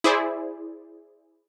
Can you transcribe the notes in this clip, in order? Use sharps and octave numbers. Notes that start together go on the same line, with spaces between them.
E4 G#4 C5 D5